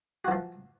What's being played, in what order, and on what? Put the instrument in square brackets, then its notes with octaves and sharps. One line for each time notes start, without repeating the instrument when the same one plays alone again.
[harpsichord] F#4
E3
F3